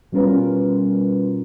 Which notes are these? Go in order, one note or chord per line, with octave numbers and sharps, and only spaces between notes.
B2 G3 C#4 F4 A#4 B4